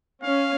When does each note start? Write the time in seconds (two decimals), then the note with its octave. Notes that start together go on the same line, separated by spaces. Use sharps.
0.24 C#4 F5